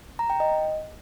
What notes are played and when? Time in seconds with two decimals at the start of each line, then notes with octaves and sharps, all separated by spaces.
0.19 A#5
0.30 G5
0.40 D#5